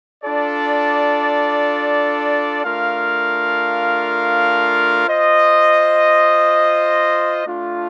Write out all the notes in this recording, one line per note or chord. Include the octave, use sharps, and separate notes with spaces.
D4 F4 A4 D5
A3 D4 F4 A#4 F5
F4 C5 D#5
A3 D4 F4